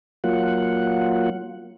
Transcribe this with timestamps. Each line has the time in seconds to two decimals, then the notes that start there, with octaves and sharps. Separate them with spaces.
0.24 F#3 A#3 F4 F#5